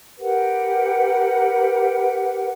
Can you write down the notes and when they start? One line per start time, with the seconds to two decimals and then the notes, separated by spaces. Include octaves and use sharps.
0.19 G4 A#4 B4 F#5